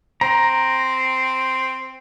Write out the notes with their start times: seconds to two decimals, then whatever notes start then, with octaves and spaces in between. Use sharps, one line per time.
0.21 C4 A#5